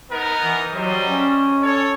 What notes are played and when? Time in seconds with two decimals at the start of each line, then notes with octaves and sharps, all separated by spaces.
0.11 B3 D#4 A#4
0.41 E3
0.73 F#3 G3 C5 D#5
1.06 C#4
1.62 A4 C#5